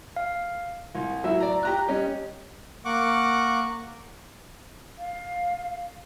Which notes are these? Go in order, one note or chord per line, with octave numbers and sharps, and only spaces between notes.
F5
C2
F#3 E4 E5 E6
D5 A#5
G4 A#5 F#6
G3 C#4 D#5
A#3 F#5 C#6 D6
F5